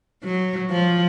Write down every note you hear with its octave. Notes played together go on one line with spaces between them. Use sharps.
F#3
F3